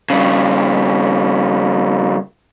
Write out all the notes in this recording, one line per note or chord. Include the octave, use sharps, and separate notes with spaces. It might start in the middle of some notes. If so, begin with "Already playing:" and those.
G2 C#3